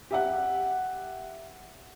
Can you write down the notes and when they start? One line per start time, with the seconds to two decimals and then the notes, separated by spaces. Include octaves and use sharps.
0.11 G4 E5 F#5